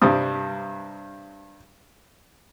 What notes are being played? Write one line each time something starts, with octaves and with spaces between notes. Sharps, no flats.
G2 C3 G3 D#6